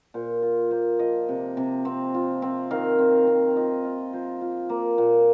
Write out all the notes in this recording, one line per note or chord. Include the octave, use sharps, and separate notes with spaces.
A#2 C5
F4
A#3 C5
F3 D#5
C3
C3
C4
F4
C4
D#3 F5
C4
C4
F4 D#5
F4 D#5
F3 C5
F4
A#3
A#2